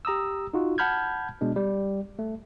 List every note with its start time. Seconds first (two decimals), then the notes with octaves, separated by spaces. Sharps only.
0.05 G4 A#5 D#6 E6
0.54 D#4 F4 F#4
0.78 F#5 A5 B5 F6 G6 G#6
1.41 B2 G#3 B3 D4
1.56 G3
2.19 A3